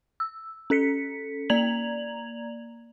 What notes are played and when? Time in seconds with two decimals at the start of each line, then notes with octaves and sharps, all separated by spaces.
0.20 E6
0.70 C#4 A4 B6 C#7
1.50 A#3 D5 A#5 G#6 F7 F#7